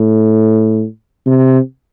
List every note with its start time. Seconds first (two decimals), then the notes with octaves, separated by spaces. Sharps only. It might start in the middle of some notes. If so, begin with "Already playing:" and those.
Already playing: A2
1.26 C3